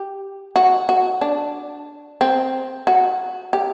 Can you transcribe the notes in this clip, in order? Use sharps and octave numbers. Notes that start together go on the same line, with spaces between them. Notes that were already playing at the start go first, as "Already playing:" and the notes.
Already playing: G4
F#4
F#4
D4
C4
F#4
G4